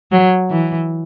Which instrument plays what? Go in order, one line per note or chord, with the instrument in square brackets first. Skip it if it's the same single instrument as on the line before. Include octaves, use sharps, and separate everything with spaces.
[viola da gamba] F#3
E3